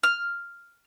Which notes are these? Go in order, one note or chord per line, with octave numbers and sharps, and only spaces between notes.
F6